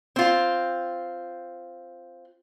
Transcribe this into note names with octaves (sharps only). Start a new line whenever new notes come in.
C4 F4